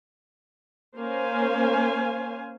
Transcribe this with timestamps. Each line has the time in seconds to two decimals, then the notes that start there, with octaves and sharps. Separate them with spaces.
0.97 A#3 C#4 C5 F5 G#5